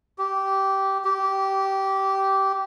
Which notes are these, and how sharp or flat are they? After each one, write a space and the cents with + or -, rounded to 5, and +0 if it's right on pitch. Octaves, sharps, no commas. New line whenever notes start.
G4 -15
G4 -15